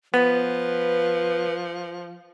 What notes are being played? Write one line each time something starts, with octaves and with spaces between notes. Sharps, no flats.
F3 B3 B4